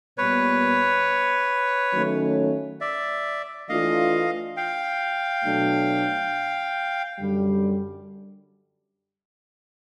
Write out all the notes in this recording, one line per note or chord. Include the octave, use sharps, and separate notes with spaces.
A#2 G3 B3 B4 C#5
D#3 F#3 A3 C#4
D5 E5
E3 A3 D4 F4 D#5 F5
F5 G5
B2 F#3 A3 D4
F#2 D3 G3